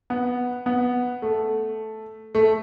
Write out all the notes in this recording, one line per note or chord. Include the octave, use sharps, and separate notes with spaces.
B3
B3
A3
A3